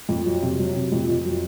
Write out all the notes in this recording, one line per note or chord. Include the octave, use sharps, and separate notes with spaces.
F2
F#3
C3
F#3
C3
F2
F2
F#3